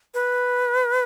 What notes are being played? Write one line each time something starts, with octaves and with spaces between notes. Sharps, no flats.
B4